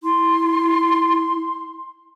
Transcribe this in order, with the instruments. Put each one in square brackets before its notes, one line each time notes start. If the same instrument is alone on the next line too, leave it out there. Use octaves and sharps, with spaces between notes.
[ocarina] E4 [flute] C6